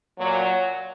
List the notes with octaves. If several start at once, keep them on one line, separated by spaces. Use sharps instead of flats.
A#2 F#3